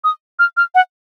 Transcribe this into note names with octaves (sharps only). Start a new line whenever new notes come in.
D#6
F6
F6
F#5